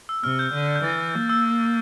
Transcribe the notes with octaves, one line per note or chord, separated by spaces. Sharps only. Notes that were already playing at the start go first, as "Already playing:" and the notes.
E6
C3 F6
G6
D3
G6
E3 A6
F6
A#3
E6
E6